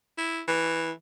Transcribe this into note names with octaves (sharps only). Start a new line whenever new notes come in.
E4
E3